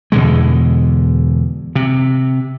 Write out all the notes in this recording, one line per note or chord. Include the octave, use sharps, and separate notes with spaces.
E2 B2 D3 G#3
C3